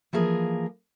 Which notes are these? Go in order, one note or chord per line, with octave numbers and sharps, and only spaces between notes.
E3 F3 A#3 G#4 A#4